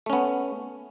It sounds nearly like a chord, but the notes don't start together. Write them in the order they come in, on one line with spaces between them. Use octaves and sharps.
A3 C#4 B3